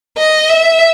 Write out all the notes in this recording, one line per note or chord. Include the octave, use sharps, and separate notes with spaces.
D#5
E5